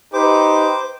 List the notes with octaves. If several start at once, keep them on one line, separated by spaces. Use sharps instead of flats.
D#4 G4 B4 C5 D6